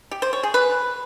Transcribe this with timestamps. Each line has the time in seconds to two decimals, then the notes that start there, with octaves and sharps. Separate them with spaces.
0.11 G4
0.22 C5
0.33 C#5
0.43 G#4
0.54 B4